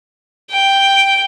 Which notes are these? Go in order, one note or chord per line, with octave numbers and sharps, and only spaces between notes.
G5